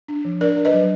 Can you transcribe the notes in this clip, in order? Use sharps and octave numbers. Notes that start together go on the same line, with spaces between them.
D4
F3
D4 A#4 D5
D4
B4 D#5
F#3